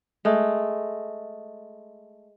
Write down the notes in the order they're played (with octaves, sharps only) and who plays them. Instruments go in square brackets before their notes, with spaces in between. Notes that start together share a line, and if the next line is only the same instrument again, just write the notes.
[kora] G#3 A3